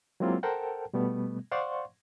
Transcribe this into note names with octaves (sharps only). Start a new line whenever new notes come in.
F#3 G#3 A#3 C4 E4 F4
A4 A#4 C5 F#5 G5 A5
B2 G3 A3 B3
C5 D5 F5 F#5 C6 C#6